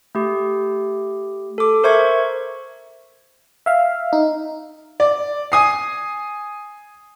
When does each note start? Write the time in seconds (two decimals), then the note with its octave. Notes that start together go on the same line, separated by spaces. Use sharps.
0.15 A3 G4
1.58 A4 D6
1.84 A#4 C5 E5 C#6 G#6
3.66 E5 F5
4.13 D#4
5.00 D5
5.52 G#5 D#6 C7